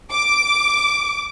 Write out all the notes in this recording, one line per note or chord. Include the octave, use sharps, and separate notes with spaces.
D6